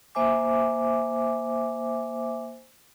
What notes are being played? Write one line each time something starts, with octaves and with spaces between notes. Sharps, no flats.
A#3 C5 E5 G#5 D6